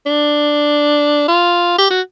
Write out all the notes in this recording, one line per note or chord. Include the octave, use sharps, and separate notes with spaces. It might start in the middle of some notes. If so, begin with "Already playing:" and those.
D4
F4
G4
F#4